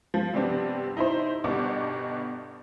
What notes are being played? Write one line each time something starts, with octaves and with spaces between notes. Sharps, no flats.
F3
G2 C3 G3 B3 C4 D4
D#4 E4 C5
G1 G2 B2 D4 F#5 D6